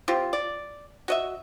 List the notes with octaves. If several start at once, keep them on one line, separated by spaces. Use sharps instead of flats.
C4 F4 G4
D5
F#4 D#5 E5